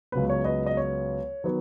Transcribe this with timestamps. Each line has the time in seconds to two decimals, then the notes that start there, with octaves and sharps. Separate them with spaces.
0.12 C#2 C#3 F#3 B3 B4
0.30 C#5
0.45 B4 D#5
0.66 D#5
0.77 C#5
1.44 D#3 F#3 B3